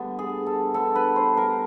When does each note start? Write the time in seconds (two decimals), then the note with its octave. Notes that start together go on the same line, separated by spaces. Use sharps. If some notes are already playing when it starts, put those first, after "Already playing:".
Already playing: D3 G3 B3 D4
0.19 G#4
0.46 A4
0.74 D3 G3 B3 D4 A4
0.95 B4
1.16 C5
1.37 A#4